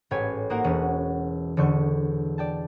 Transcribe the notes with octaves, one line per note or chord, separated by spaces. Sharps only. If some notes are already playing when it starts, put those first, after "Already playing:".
A1 G#2 B4 C#5 G5 G#5
A#3 D#4 F#4 A#4 C5 F#5
E1 C#4 F#5
E1 D3 C#6 G6
D5 G5 A5